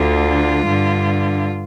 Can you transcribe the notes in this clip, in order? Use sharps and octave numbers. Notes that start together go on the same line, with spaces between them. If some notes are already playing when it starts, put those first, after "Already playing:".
Already playing: D2 D3 F4
G2 D3